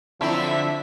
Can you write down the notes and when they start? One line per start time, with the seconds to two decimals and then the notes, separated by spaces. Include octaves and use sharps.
0.21 D3 F3 F#3 C4 D4 E4 E5 B6